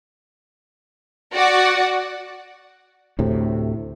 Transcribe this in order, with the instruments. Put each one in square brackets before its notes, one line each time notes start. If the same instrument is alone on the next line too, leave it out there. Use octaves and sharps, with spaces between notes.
[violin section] F#4 D5 F#5
[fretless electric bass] D2 A2 C3